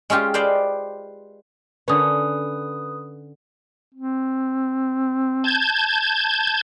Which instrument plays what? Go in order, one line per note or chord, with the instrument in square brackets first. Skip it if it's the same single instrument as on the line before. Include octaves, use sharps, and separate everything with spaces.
[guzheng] G#3 C#4 F4 G4
B4 C5 D5 D#5 F5 G5
[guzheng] D3 C#4 [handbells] B4 D#6
[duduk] C4
[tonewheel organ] A5 G6 G#6